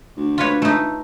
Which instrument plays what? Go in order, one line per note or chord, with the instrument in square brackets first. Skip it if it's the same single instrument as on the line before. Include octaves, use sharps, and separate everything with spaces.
[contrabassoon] D2
[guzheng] F4 B4 C#5
A3 D#4